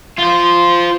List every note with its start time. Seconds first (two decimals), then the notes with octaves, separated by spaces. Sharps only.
0.19 F4 C5